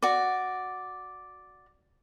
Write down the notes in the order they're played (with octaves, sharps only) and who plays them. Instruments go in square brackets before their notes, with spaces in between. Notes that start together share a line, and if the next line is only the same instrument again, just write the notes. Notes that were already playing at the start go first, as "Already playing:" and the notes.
[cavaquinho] F#4 D5